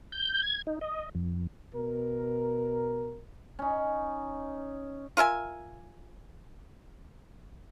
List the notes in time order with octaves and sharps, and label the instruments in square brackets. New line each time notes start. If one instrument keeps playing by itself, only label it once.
[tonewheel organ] G6
G#6
D#4
D#5
F2
[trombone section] B2 A#4
[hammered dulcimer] C#4 D#4
[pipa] F4 A#4 E5 G#5